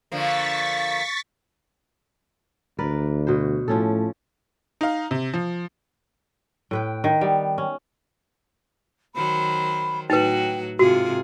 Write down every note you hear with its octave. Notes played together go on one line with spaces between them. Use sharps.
D3 F3 A#3 C#6 A6 B6
D2 A#4 B4 D5
B2 F#4 C5
A2 F3 C#4 A4
D#4 F5
C3
F3
A2 B4 G5
D#3
G3 B3
C#4
D#3 F#3 C5 B5
A2 F#3 D#4 F#4 B4 G5
G#2 C3 F4 F#4 G#4